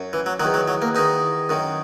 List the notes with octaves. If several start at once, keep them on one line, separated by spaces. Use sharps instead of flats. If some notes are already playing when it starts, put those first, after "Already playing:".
Already playing: F#2
E3
F#3
D#3 F#3
E2
F#3
F#3
A#3
E2 D#3 D#4
F#2 D#3